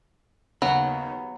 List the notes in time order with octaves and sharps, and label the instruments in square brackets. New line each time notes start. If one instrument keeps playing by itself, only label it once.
[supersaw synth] D#2 C#3 [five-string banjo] F#3 [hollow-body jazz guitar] B3